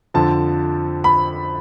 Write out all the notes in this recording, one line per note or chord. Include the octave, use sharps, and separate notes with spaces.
F2 D3 F3 A5
B5